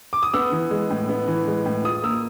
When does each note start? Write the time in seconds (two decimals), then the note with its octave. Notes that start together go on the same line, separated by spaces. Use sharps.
0.13 D6
0.23 D#6
0.33 B3 E6
0.52 E3
0.71 G#3
0.90 A2
1.09 B3
1.28 E3
1.47 G#3
1.65 A2
1.84 F4 D#6
2.03 A#3 E6